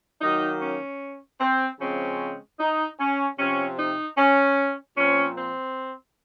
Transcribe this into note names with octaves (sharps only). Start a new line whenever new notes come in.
D#3 F#3 A#3 D#4
C#4
C4
C#3 F3 G#3 C4 C#4
D#4
C#4
C3 F3 C4 C#4
D#4
C#4
A#2 F3 C4 C#4
C4